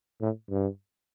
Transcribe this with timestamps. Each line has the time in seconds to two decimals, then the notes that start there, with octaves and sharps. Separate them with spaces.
0.21 A2
0.50 G2